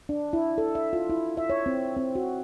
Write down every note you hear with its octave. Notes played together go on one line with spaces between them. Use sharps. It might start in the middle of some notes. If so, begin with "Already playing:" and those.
D4
E4
A4
E5
F4
E4
E5
C#5
C4
C4
F#4